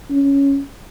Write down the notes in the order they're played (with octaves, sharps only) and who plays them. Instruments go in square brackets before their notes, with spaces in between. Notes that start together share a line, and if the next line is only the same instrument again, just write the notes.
[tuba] C#4